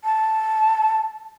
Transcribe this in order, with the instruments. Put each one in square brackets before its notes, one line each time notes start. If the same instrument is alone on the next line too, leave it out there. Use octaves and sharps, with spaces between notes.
[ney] A5